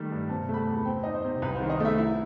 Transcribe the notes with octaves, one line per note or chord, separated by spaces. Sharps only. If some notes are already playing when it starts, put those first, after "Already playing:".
Already playing: D#3 G3 A3
G2
C3 A5
A3 B5
A5
E2
C4 G5
D#4 D#5
C5
C3
C2 B4
C5
D#3
D#5
A3 E5
E4